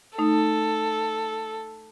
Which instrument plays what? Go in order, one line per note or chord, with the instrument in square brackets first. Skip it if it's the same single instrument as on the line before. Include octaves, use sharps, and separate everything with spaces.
[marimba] A3 D#4 [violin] A4